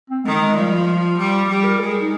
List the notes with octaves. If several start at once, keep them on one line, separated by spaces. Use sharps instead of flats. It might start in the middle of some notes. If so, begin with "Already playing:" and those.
C4
D#3 G#3
G#3
F3 G3
F4
G3
G3 G4
A#4
G#3 G#4
D#4